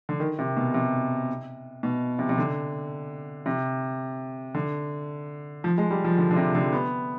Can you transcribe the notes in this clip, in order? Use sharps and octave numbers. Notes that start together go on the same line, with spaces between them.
D3
D#3
C3
B2
C3
B2
C3
C3
D3
C3
D3
F3
G#3
G3
F3
D3
D3
C3
D3
B3